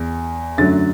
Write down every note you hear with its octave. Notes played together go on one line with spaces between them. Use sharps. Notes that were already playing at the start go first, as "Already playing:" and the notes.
Already playing: E2
F#2 D3 F#3 A3 A6